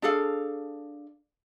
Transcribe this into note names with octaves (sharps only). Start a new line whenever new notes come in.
D4 G#4 A4 F5